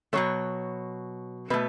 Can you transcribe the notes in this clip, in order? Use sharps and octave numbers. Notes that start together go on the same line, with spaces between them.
B2 F#3 A3 C#5
B2 A3 B4